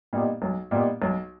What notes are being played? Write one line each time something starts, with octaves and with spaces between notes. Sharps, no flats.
A#2 G3 B3 D#4
B1
A#2 G3 B3 D#4
B1